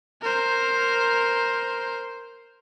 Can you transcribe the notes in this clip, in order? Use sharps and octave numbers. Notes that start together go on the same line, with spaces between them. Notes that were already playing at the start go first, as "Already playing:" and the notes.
A#4 C5